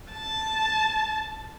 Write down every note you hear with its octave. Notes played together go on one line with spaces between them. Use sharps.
A5